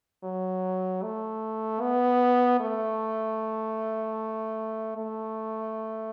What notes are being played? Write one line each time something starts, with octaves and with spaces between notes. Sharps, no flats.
F#3
A3
B3
A3
A3